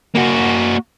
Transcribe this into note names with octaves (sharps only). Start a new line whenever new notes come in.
A#3 F#4